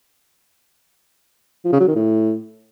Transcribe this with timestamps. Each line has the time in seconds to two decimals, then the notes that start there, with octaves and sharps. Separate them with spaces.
1.64 F3
1.72 C#3
1.80 F#3
1.88 D#3
1.96 A2